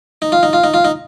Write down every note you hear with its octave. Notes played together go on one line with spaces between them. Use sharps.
D#4
F4
D#4
F4
D#4
F4
D#4